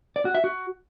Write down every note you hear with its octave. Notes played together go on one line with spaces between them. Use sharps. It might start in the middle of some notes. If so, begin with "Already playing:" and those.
D5
F#4
E5
F#4